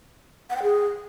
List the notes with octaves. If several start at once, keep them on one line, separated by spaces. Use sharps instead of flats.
F#5
G5
G#4